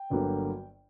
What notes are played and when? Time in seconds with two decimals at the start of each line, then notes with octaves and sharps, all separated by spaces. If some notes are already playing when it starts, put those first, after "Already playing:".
Already playing: G5
0.10 G1 G2 D3 F#3 A#3